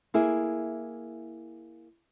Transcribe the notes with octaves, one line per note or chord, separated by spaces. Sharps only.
A#3 E4 G#4